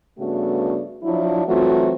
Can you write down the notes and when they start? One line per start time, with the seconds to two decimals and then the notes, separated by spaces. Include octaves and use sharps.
0.18 G2 C#3 A3 B3 D4 F#4
1.03 F3 F#3 D4 E4
1.46 E3 F#3 A3 C4 F4 F#4